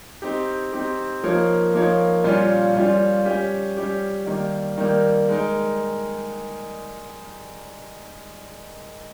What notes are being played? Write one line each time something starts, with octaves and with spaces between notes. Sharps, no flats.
C4 D#4 G4
C4 D#4 G4
F3 A#3 D#4 A#4 C#5
F3 A#3 D#4 A#4 C#5
A#2 G3 C#4 F4
A#2 G3 C#4 F4
G3 C#4 G4
G3 C#4 G4
D#3 G3 A#3
D#3 G3 A#3
G#3 D#4 A#4